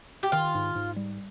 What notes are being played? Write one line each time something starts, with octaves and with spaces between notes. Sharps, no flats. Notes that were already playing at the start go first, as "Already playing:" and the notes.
G4
D#3 F4
G#2
G#2
G3